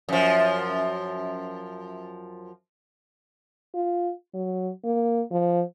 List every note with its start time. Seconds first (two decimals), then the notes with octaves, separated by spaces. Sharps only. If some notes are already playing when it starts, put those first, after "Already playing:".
0.09 F#2 F3
3.75 F4
4.34 F#3
4.85 A#3
5.31 F3